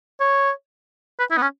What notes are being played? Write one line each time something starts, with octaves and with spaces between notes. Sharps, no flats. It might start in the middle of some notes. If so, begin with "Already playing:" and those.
C#5
B4
E4
B3
C#4